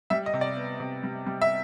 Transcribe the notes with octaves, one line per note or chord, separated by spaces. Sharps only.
G3 E5
D#5
C3
D5
B3
C3
G3
G3
E5